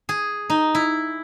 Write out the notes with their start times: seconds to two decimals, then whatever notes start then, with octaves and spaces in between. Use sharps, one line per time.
0.09 G#4
0.50 D#4
0.75 E4